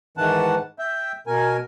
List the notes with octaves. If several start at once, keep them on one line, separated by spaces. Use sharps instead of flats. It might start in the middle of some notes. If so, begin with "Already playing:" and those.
G#2 D#3 E3 F#5 A5
E5 G5
B2 A#4 G#5